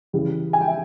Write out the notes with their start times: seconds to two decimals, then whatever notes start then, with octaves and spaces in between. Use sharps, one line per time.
0.13 C#3 E3 G3
0.53 G#5
0.61 G5
0.68 E5